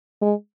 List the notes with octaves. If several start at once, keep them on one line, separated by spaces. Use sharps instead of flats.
G#3